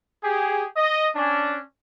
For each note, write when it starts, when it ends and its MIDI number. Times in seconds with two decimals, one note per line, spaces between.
0.23 0.64 67
0.23 0.64 68
0.77 1.07 75
1.15 1.59 61
1.15 1.59 62